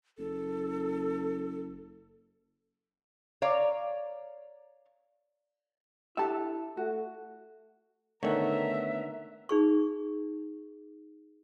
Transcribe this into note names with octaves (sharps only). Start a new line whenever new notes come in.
F#1 A4
C#5 D5 F5 A#5
D4 E4 G4 A4 E5 A5
A3 F#4
D3 D#3 A3 B3 A#4 C#5 E5
D#4 G#4 C#6